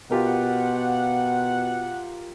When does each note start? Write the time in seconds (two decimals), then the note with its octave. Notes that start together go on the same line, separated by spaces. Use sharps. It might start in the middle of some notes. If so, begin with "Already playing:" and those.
0.11 B2 F4 G4 A#4 F#5